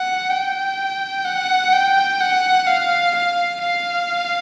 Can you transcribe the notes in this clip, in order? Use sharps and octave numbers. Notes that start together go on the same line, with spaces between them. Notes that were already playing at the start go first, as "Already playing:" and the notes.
Already playing: F#5
G5
F#5
G5
F#5
F5
F5
F5